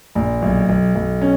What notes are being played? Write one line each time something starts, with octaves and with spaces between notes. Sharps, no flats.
A#1
B1
B1
B1
C#4